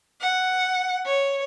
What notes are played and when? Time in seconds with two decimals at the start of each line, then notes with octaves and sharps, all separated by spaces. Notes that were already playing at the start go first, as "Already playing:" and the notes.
0.21 F#5
1.05 C#5